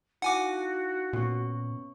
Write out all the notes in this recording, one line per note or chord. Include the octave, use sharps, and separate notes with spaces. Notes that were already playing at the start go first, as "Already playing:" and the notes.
D#4 E4 F#4 F5 F#5 G#5 D6
A#2 B3 C#4 C#6